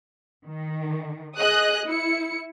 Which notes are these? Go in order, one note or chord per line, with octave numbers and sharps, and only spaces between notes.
D#3
G#4 D#5 D#6 F#6
E4 C#7